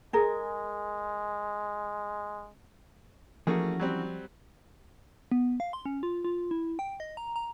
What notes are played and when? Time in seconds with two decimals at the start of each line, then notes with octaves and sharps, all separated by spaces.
0.13 G#3 G#4 A#4
3.47 E3 F3 A3 A#3 C#4 F#4 G#4
3.79 F#3 G3 C4
5.32 B3
5.60 F5
5.73 C6
5.85 C#4
6.03 F4
6.25 F4
6.51 E4
6.79 G5
7.00 D#5
7.17 A#5
7.36 A#5